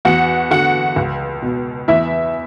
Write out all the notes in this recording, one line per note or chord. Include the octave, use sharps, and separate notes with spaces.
E2 F#4 F#5
D3 F#4 F#5
C#2
B2
E2 E4 E5